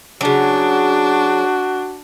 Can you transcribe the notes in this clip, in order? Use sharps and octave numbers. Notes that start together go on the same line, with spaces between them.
C#3 F#3 D4 F#4